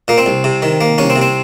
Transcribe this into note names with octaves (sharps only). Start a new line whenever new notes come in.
A#2 A#3
C4
C2
C3
D#3
A#3
C2 C#4
C4
C3
C4